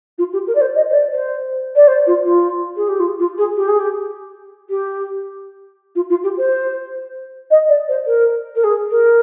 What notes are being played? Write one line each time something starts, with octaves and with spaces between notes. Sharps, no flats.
F4
G4
A#4
D5
C5
D#5
C5
D5
C5
D5
C5
F4
F4
G#4
G4
F4
F4
G#4
G4
G#4
G4
G4
F4
F4
G4
C5
D#5
D5
C5
A#4
A#4
G#4
A#4